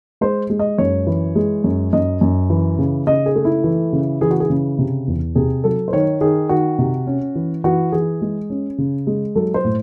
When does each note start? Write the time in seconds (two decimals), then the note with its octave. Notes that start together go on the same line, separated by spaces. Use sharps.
0.21 G#3 C5
0.50 G#3
0.59 D#5
0.78 F#2 C#5
1.07 E3
1.35 G#3
1.64 F#2
1.93 F#2 D#5
2.21 F#2
2.50 E3
2.79 C#3
3.07 C#3 D#5
3.26 G#4
3.36 A3
3.45 E4
3.64 E3
3.93 C#3
4.21 E3 G#4
4.31 F#4
4.40 G#4
4.50 C#3
4.78 C3
5.07 E2
5.35 C3 G#4
5.64 F#3 A4
5.88 C5
5.93 D#3 C#5
6.21 D#3 G#4
6.49 D#3 F#4
6.79 C3
7.07 C#4
7.35 E3
7.64 E3 F#4
7.92 E3 G#4
8.22 G#3
8.50 C#4
8.78 C#3
9.07 G#3
9.35 F#3 A4
9.54 C5
9.64 A2